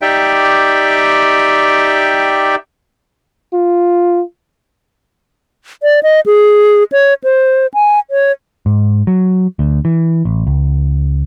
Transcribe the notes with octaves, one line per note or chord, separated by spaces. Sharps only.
D#4 G4 D5 E5 G5
F4
D5
D#5
G#4
C#5
C5
G#5
C#5
G#2
F#3
D2
E3
A1
C#2